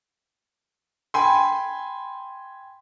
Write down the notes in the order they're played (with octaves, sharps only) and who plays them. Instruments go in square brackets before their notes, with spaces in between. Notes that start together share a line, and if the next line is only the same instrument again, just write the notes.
[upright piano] G5 G#5 B5 C6